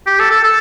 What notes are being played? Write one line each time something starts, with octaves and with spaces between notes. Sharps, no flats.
G4
A4
A4
A4